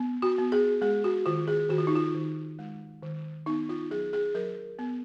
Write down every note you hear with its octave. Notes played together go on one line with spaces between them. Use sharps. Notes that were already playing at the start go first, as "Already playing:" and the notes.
Already playing: B3
F#4
B3
G#4
G#3 G#4
F#4
D#3 F4
G#4
D#3 F#4
F4
D#4
F4
D#3
G#3
D#3
B3 D#4
F4
F#3 G#4
G#4
F#3 A#4
B3